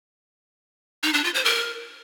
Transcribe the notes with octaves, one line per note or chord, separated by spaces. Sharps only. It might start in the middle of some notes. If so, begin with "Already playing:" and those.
D#4
D4
F4
C5
A#4